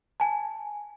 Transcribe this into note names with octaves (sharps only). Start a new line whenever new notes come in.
G#5 A5